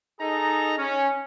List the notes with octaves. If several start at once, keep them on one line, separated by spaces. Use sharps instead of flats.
D#4 G#4 A4 A#5
C#4